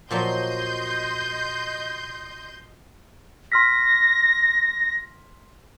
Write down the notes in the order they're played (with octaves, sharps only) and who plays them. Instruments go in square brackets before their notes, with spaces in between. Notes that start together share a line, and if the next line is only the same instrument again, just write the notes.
[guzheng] A#2 F3 F#3 [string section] D#5 C6 G6
[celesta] C6 F6 B6 [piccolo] A#6